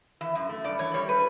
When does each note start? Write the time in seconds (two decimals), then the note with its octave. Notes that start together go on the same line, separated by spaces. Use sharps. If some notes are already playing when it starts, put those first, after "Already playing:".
0.21 E3 E5
0.35 F#2
0.49 A3
0.64 G2 D5
0.79 E3 C#5
0.94 G3 C#5
1.09 B4